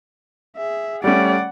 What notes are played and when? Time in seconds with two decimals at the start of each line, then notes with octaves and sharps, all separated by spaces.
0.57 G#4 E5
1.04 G3 A3 C#4 D5 F#5